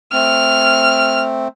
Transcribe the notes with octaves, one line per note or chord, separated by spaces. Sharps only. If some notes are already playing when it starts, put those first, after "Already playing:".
A3 C4 F6